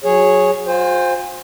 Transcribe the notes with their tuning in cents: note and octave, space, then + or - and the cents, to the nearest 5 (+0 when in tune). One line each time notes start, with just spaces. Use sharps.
F#3 -15 G#4 +0 C#5 -10
F4 +45 C5 +0 G#5 -40